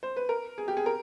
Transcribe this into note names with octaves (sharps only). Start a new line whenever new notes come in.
C5
B4
A#4
G#4
G4
G#4
A#4